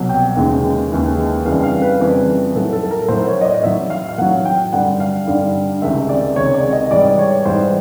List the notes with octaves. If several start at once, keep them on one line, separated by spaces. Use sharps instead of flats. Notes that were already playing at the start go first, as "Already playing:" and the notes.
Already playing: C2 B2 F#3
G5
D#2 C#3 E3 G#3
D#2 C#3 E3 G#3
F2 C#3 E3 G3 F5
F5
B4
F2 C#3 E3 G3
A2 F#3 A4
A4
A4
A#4
A2 F#3 C5
C#5
D#5
D5
A2 F#3 E5
F5
F5
A2 F#3 F#5
G5
G2 D3 G3 F#5
F5
G2 D3 G3
C#2 C3 D#3 G#3 E5
D5
C#2 C3 D#3 G#3 C#5
D5
D#5
G#2 E3 G3 D5
C#5
G#2 E3 G3 C5